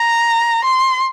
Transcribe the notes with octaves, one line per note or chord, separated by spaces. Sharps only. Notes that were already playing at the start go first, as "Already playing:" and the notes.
Already playing: A#5
C6